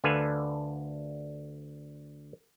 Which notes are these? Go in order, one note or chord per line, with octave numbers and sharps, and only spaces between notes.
D2 D3 A4 B4 F5 G#5